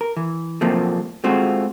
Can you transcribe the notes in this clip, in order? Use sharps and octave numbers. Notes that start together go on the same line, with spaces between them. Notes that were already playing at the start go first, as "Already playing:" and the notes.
A#4
E3
F3 F#3 A3 A#3 C4
G#3 A3 C4 F4 F#4